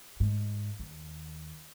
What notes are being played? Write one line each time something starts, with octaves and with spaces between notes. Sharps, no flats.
G#2
D#2